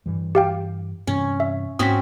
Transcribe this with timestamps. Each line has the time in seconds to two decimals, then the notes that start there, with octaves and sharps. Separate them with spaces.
0.06 G2 E3 G3
0.35 G4 F5 G5
1.07 G2 C3 E3 C#4
1.40 E5
1.79 G#2 C4 C#4 F#4 D#6 B6